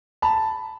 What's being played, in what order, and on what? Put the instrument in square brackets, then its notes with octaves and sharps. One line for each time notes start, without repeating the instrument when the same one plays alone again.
[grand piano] A5 B5